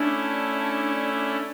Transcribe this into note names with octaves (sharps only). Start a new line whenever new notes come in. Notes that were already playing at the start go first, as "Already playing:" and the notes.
Already playing: A3 C#4 D4 E4